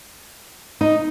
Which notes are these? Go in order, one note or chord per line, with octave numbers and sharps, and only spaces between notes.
D#4